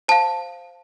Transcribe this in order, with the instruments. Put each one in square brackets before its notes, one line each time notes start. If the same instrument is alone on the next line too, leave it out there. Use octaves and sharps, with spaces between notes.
[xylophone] C5 F5 A5